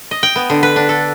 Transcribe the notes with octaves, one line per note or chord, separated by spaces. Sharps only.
D#5
G5
B3
D3
B4
D4
A4